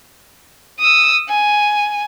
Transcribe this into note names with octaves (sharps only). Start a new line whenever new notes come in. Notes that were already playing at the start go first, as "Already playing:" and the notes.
D#6 E6
G#5